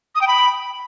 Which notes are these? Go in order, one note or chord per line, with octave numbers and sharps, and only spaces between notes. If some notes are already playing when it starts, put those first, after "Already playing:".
D#6
G5
B5